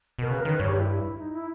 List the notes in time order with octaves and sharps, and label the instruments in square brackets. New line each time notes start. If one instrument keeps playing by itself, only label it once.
[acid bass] B2 [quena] A#4
[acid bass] C#3 [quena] B4
[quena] A#4
[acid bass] D#3 [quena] B4
[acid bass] G2 [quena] C#5
[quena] G4
E4
D#4
E4